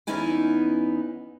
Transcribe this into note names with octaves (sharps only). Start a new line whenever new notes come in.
E2 B3 C#4 D#4 E4 G#5